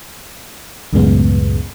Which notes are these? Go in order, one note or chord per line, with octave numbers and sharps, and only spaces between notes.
C#2 F#2 A2 C#3 G#3 B3